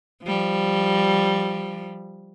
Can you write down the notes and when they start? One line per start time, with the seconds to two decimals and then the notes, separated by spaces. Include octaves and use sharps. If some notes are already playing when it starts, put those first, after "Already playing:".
0.23 F3 G3